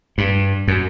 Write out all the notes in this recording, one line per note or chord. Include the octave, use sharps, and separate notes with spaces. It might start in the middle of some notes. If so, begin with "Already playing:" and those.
G2
F#2